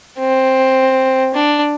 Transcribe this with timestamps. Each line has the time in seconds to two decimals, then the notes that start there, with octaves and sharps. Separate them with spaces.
0.19 C4
1.34 D4